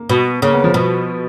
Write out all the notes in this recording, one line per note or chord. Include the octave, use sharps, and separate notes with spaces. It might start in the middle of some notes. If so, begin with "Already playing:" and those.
Already playing: A#3
B2
C#3 A#3
B3
F3
B2